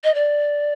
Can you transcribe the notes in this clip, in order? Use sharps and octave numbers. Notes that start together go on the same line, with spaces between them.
D#5
D5